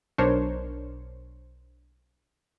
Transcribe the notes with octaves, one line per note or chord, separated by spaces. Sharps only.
B1 D4 A#4 C5 C#5